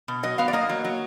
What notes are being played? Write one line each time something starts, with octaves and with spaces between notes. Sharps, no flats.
B2
F#3 D#5
B3 F5
D5
A#3 D#5
F#3
F#3